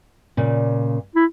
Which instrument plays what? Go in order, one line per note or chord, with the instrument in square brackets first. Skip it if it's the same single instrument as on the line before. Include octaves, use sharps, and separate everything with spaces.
[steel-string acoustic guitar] A#2 C#3
[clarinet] E4